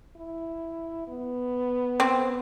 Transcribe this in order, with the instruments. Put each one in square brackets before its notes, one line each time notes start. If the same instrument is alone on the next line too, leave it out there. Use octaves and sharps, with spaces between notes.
[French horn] E4
B3
[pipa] C4